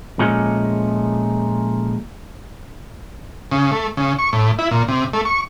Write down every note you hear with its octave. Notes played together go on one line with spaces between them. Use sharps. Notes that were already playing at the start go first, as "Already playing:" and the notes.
A#2 F3 G#3 A3 C#4
C#3
A3
C#3
C#6
A2
E4
A#2
C3
A3
C#6